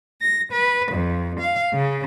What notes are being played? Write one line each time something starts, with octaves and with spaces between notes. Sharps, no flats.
A#6
B4
F2
F5
C#3